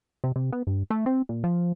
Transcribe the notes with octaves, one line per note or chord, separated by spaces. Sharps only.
C3
C3
B3
G2
A3
C4
A#2
F3